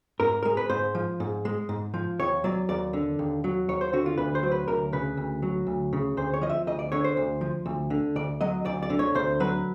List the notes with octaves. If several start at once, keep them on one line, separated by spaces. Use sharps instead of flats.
G#2 A#4
G#3 A#4
B4
G#2 C5
F3
G#2
G#3
G#2
F3
D#2 C#5
F#3 D5
D#2 D5
D3
D#2
F#3
D#2 C#5
C5
D3 F#4
F4
D2 B4
C5
F#3
B4
D2 A#4
C#3 B4
D2
F#3
D2
C#3
D2 C5
C#5
F3 D#5
E5
D2 D#5
D5
D3 C#5
C5
D2
F3
D2
D3
D2 D5
F#3 D#5
D2 D5
D5
D3
C#5
D2 C5
F#3 B4